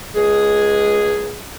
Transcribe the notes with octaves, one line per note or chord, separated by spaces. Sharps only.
C#2 G#3 G#4